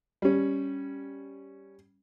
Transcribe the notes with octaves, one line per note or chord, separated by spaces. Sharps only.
G3 C#4